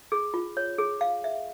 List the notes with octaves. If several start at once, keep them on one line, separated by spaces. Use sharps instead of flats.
G#4
F4
C#5
G#4
F5
E5